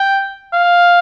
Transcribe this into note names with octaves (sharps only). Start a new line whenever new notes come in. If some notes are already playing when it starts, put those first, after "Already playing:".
Already playing: G5
F5